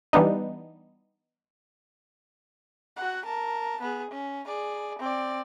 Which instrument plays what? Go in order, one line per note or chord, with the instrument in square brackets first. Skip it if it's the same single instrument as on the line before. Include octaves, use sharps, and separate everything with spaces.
[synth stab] E3 G3 B3 D4 D#4
[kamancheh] F#4 F#5
A#4 A5
B3 G#4
C#4
G#4 D5
C4 D5